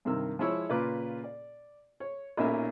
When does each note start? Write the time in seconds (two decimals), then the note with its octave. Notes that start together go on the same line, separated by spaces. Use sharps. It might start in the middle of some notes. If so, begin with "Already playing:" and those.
0.05 G2 C3 D#3 A#4 E6
0.39 F3 G#3 E4 C#5 E6
0.69 A#2 C#3 F4 B4 D6
1.24 D5
2.00 C#5
2.37 B1 A#2 C#4 D#4 A#4 E5